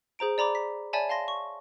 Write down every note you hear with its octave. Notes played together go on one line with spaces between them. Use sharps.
G#4 C5 A#5 D7
D5 A#5 B5 D6
B6
C#5 D5 E5 G#5 A5 B5
F5 A5 C6 A#6
C#6